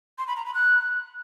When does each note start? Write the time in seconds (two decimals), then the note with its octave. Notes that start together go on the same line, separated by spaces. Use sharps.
0.18 C6
0.27 B5
0.36 A#5
0.45 B5
0.54 F#6